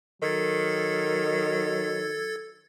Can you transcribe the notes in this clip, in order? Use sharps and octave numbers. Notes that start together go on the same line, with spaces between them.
D#3 F#3 A4 G#6 A6